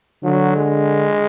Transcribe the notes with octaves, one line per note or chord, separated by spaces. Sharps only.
D3 F#3
G#3